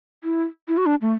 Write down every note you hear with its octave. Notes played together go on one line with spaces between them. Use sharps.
E4
E4
F#4
D4
A3